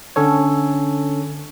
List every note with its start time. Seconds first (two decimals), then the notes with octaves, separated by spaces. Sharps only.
0.16 D3 C#4 A4 C#5